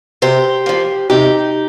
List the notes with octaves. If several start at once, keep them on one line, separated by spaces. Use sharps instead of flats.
C3 G4 C5
F3 A#3
C3 D#4 G4